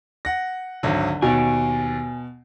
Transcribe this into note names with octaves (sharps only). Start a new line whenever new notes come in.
F#5 A#6
G#1 D2 D3 F#3
D#2 B2 C#5 F5 G#5